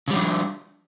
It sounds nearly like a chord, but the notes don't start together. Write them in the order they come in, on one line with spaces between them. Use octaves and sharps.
C#3 G3 F3 D4